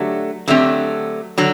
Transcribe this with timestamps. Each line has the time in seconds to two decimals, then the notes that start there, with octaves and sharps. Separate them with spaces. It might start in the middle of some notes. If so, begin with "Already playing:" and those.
Already playing: D3 F#3 A3 G4
0.48 D3 F#3 A3 C4 G4
1.38 D3 F#3